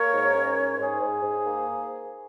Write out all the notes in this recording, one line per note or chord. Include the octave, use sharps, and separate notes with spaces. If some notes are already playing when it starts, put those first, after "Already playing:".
Already playing: A#3 A#4 C#5
G#2
C#4
G#2
G#2 G#4 C5
G#2
G#2
A#3